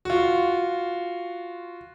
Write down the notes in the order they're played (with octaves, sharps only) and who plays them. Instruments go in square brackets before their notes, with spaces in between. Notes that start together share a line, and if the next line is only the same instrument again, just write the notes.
[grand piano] F4 F#4